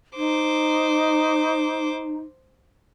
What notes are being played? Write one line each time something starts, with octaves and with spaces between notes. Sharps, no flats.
D#4 C5 D6